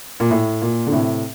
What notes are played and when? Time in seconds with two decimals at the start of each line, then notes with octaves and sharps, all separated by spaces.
0.20 A#2
0.31 A2
0.62 A#2
0.87 D3
0.92 A2 C3